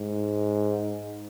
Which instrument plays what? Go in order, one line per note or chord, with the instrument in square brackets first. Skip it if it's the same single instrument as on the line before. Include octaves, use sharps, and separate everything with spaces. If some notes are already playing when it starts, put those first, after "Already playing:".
Already playing: [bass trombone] G#2